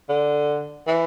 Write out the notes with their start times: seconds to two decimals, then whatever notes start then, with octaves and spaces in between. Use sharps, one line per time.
0.09 D3
0.87 E3